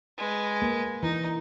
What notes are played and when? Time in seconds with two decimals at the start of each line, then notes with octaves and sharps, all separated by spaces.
0.18 G#3 B4
0.62 A#3
1.03 E3 D#4